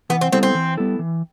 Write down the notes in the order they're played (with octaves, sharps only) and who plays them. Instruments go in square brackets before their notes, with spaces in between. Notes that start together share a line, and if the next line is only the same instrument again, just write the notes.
[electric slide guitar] E3 [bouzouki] B3
[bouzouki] C4
[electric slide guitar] G3 B3 E4 A4 [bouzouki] C4
[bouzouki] C4
[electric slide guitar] E3
G3 B3 E4 A4
E3